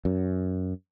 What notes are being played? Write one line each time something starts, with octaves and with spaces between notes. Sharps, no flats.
F#2